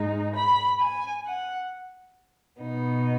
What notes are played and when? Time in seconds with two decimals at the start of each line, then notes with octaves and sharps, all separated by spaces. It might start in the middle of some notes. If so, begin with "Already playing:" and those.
Already playing: G#2 G#3 D#4
0.35 B5
0.80 G#5
1.25 F#5
2.61 B2 B3 D#4